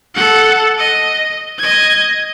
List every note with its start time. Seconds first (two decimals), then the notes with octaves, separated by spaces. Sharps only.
0.15 A4 F#5
0.78 D#5
1.59 D#5 G#6